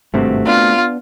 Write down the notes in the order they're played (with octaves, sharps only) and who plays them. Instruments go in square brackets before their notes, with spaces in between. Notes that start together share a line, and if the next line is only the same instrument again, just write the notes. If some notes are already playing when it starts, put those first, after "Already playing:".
[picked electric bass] G#1 G2 C3 [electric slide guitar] A3 C4 F#4
[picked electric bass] B3 D4 [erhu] F4